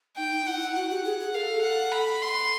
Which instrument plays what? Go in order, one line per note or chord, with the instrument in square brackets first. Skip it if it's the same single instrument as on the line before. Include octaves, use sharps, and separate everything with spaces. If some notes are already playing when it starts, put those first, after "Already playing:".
[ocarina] D#4 [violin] G5
[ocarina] D#4
[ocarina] E4 [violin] F#5
[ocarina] E4
[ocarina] F#4 [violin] F#5
[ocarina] G4
G#4
G#4
[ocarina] A4 A#4 [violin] F5
[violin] F#5
B5
C6